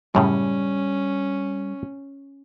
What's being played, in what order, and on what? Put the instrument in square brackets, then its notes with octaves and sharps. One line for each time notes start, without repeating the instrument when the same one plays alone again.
[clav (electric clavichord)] F#2 A2 C#3 [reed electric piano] G3 [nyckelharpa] C#4